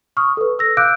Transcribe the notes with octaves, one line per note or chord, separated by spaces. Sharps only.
C#6 D#6 F6
A4 B4
E6 A#6
F5 D6 E6 F#6 G6 D7